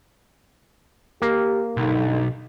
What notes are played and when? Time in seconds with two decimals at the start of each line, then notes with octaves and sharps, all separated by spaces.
1.22 A#3 G4
1.77 B1 G2 D3 D#4